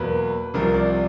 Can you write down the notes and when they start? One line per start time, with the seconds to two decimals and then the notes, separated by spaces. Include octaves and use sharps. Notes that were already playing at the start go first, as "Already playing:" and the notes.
Already playing: E2 B2 F#3 A#3 B4
0.54 C2 C3 F3 A#4
0.74 D5